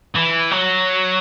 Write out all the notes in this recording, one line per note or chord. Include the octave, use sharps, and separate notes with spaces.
E3
F#3